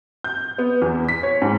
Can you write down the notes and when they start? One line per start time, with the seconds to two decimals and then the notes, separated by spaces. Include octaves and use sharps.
0.24 G6
0.58 B3
0.82 E2
1.09 B6
1.23 C#5
1.42 G#2